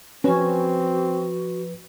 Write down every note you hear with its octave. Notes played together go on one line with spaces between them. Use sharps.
F3 C4 C#4 F#4 B4